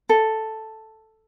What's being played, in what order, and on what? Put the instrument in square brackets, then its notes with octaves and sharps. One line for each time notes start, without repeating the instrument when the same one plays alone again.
[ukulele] A4